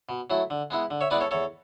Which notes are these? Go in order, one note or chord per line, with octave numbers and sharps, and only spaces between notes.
B2
F#3 A3 E4
D3
G#3 B3 E4
D3
C#5 E5
G#3 B3 E4 B4 D5
A4 C#5
E2 A4 C#5